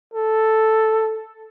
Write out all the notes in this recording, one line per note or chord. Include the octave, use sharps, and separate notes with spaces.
A4